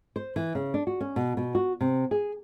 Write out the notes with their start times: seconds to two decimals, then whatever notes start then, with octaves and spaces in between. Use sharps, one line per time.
0.16 C5
0.36 E3
0.55 C#3
0.74 D4
0.87 F#4
1.01 C#4
1.16 B2
1.37 B2
1.55 F#4
1.81 C3
2.11 G#4